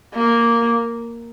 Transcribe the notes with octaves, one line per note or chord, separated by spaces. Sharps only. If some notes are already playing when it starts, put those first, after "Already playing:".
A#3